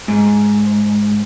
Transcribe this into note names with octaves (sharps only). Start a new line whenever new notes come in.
G#2